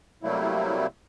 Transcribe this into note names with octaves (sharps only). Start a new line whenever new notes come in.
C3 F#3 G3 A3 A#3 E4